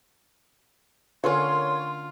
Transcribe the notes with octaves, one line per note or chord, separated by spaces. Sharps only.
D3 A3 C#4 F4 A#4 C#5 C6